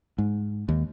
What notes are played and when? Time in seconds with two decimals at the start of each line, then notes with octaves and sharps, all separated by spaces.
0.18 G#2
0.69 D#2